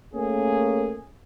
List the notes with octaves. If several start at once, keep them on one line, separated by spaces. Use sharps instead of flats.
A3 A#3 C#4 G#4